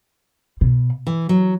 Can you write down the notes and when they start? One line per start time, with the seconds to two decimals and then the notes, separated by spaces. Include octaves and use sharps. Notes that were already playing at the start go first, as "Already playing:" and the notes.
0.61 B2
1.07 E3
1.29 F#3